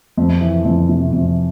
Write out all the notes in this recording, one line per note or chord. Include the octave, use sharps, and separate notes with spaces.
F2
E3
F2
C3
F2